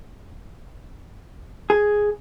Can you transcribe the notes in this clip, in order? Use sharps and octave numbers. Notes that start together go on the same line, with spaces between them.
G#4